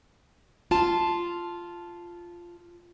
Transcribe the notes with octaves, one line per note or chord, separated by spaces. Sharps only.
F4 A5